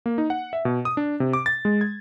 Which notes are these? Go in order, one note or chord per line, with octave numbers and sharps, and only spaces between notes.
A#3
D#4
F#5
E5
B2
D#6
D4
C3
D6
A6
G#3
G#6